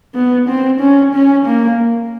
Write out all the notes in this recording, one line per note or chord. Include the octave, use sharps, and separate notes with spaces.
B3
C4
C#4
C#4
A#3